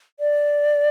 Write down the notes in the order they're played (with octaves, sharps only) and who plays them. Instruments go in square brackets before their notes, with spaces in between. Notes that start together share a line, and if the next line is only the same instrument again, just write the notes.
[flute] D5